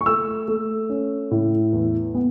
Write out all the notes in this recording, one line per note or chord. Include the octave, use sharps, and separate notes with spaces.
C#6
A3 E6
A3
C#4
A2
E2
B3